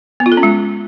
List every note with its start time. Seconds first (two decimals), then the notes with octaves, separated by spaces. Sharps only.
0.20 B3
0.26 F4
0.32 A4
0.37 C#4
0.43 G#3